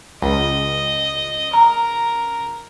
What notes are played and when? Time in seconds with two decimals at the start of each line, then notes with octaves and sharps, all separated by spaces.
0.22 C#2 D#5
1.54 A#4 A#5